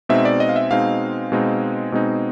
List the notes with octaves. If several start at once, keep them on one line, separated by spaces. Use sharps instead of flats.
B2 G#3 C4 D#4 E5
D5
D#5
F5
E5
B2 G#3 C4 D#4 F5
B2 G#3 C4 D#4
B2 G#3 C4 D#4